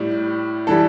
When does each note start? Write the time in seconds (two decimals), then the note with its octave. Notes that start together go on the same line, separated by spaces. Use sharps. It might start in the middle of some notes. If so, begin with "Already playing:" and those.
Already playing: A2 G3
0.67 E3 G3 A4